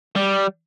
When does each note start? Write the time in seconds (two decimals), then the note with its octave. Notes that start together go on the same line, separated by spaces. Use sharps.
0.16 G3